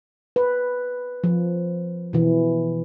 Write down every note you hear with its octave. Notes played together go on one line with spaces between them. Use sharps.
B4
F3
B2 E3